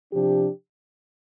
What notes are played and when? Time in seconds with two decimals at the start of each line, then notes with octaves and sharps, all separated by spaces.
0.11 C3 F3 D4 G4